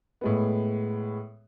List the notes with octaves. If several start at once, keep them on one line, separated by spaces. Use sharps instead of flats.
A2 G#3 B3